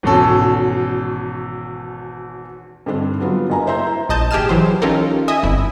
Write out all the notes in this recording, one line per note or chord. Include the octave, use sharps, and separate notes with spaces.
G#1 E2 B2 C#4 A4
G2 D3 C4 D4
D3 F#3 G3 B3 F4
F#1 G#5 A#5
E4 C5 E5 A#5 C6 G6
E4
A#1 D#5 A5 G6
G#1 G4 G#4 A5 F6 E7
E3 F#3 C5
C#4 D#4 F4 G4 A4 A#4
D#5 E5 G#5 D#6
G1 F2 E4